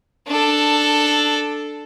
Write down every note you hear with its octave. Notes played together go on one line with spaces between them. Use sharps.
D4 A4